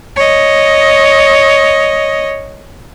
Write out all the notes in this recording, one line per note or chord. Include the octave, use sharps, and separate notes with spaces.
C#5 D#5